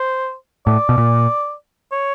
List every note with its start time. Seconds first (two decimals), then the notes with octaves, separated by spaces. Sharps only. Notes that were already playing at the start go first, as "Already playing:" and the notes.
Already playing: C5
0.66 A2 D5
0.89 B2
0.98 A#2
1.92 C#5